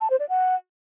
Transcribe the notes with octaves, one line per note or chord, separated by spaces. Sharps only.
A5
C5
D5
F#5